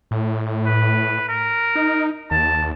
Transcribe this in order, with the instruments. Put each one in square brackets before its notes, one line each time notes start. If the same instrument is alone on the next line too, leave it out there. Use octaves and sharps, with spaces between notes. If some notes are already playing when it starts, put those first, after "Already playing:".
[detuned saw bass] A2
[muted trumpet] B4
A#4
[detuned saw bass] D#4
[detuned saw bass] D#2 [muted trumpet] A5